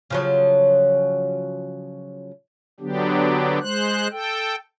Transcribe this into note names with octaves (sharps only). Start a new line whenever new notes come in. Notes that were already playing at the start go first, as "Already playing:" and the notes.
C#3 F3 F#3
D3 F#3 B3 D4 G4
G#3 C5 F#6
A4 G5